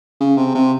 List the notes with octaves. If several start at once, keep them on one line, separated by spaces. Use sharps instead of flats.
C#3
C3
C3